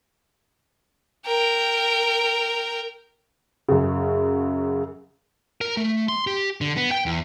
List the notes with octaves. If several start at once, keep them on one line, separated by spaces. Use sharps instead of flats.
A#4 G5
F#2 C#3
A#4
A3
C6
G4
D3
B3
G5
E2